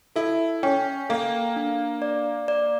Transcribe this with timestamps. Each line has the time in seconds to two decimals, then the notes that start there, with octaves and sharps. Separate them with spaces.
0.16 E4 A4
0.63 C#4 G5
1.09 A#3 A4
1.56 D4
2.02 D5
2.48 D5